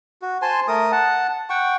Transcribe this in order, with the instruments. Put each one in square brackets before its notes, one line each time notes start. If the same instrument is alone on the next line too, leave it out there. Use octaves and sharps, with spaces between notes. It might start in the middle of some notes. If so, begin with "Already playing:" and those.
[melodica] F#4
C5 G#5 A5 C6
A3 A#4 D#6
F#5 A5
F#5 G5 C#6